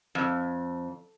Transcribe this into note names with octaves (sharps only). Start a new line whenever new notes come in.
F2